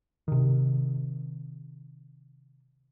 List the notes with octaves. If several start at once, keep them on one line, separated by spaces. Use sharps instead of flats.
C3 D#3